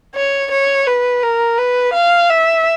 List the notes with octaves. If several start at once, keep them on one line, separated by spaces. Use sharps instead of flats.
C#5
C#5
B4
A#4
B4
F5
E5